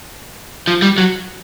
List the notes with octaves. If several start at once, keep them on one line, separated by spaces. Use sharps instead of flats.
F3
G3
F#3